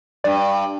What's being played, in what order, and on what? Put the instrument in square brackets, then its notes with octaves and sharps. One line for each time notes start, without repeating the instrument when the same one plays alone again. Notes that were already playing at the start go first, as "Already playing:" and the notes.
[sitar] G2 [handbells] D5